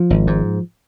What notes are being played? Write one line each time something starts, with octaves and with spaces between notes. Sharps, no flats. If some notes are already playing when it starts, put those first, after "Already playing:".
Already playing: F3
G#1
G#2